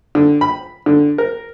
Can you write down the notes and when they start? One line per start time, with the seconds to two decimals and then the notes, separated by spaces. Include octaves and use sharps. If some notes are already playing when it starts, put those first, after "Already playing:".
0.15 D3
0.41 B5
0.86 D3
1.18 A#4